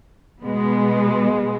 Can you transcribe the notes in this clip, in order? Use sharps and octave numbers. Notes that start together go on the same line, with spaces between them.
B2 G#3 B3